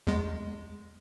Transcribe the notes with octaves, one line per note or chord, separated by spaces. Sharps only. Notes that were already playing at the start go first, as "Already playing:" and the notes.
E2 G#3